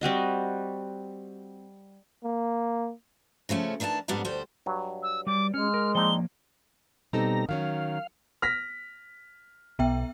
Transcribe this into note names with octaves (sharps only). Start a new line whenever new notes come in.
G3 C4 F#4 D#5
A#3
C#3 F3 A3 C#4
D#3 E3 D4 A#4 A5
F2 G#2 G3 B3 D4 D#4
D2 G3 C5
G2 F#3
E6
G3 G4 D5 D6
G#3 C#4 F6
A#4
F3 A#3 C4 D4 D#4 G7
B2 G3 C4 D#4 A4 A#5
D#3 F#3 C#4 F5
F6 A#6 B6
B1 B3 E5 G5